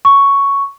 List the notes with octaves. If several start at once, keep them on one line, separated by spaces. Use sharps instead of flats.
C#6